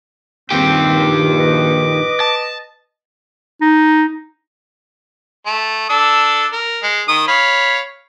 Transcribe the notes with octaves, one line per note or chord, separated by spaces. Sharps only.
A#1 G2 D#3 C4 G4 D6
B4 D#5
A5
D#4
A3
D4 A4 E6
A#4
G#3
D#3 D#6
C#5 F5 B5